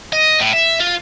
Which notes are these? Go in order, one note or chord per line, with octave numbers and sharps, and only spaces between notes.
D#5
A2
E5
F4